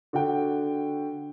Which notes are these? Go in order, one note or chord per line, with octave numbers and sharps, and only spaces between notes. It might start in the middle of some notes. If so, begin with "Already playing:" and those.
D3 F#4 F#5 G5